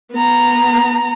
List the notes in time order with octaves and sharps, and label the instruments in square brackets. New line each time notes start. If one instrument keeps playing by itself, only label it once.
[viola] B3 A#5